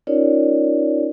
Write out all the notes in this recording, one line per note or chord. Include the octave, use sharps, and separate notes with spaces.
C#4 D#4 F4 A#4 C#5 D5